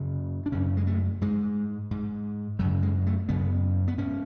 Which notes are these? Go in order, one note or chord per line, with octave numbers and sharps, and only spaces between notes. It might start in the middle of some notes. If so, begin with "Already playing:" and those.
Already playing: F#2 C#3
D4
F#2 C#3 C#4
G#3
A3
G#2 G#3
G#2
F#2 C#3 F#3
G#3
A3
F#2 C#3 B3
B3
G#2 C#4